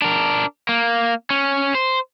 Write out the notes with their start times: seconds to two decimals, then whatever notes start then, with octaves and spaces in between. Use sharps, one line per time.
0.02 D4 A#4
0.69 A#3
1.30 C#4
1.75 C5